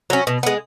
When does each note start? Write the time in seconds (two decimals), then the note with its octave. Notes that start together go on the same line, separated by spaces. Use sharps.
0.10 F#3 C#4
0.27 B2
0.43 G#3 B3